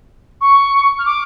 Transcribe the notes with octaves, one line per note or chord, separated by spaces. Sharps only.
C#6
F6
D6